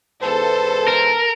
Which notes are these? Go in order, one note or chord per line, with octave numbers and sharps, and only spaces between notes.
E2 G#2 A4 B4 C5
A#4